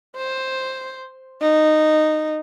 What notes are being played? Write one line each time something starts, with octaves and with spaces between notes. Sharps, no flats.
C5
D#4